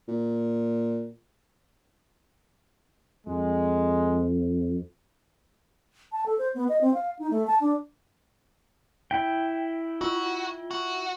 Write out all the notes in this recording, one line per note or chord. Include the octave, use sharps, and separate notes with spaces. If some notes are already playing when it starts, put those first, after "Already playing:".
A#2
F2 G#3
A5
A4
C5
B3
D#5
C4
F5
D#4
A3
A5
D4
E4 G5
F4 F#4
F#4